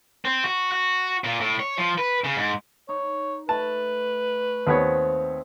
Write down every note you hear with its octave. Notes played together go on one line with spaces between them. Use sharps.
C4
F#4
F#4
A#2
A2
C#5
F3
B4
C#3
G#2
D#4 C#5
A3 B4 A5
D#2 B3 C4 C#5